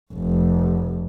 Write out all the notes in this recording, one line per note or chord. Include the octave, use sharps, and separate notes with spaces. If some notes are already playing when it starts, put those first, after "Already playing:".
F1